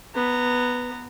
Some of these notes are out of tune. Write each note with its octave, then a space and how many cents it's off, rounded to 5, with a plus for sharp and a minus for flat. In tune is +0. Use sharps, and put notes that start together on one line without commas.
B3 +0 A#5 -20